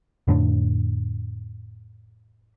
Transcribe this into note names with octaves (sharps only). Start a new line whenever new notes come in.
F2 A2 D3 D4